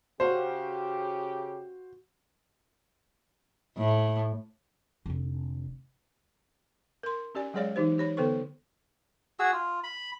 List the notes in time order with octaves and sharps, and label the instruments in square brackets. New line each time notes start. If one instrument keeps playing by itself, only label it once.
[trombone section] C#3 G4 [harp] F#4 F5 [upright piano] C5
[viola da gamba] A2
[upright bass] F1 D3
[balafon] A#4 C6
C#4 G4 D5 G#5
F#3 G#3 G#4 C#5 D5 F5
E3 D#4 G4 C5
G4 C#5 B5
D3 B3 A4 C5 C#6
[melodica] F#4 G#4 E6
F4
B5